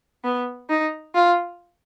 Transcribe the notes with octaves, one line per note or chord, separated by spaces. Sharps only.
B3
D#4
F4